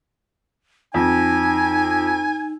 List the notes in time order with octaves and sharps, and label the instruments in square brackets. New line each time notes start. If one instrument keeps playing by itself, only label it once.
[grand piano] F2 [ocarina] D#4 [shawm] G#5